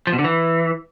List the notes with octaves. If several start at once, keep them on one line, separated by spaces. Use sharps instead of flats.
F3
B2
D3
E3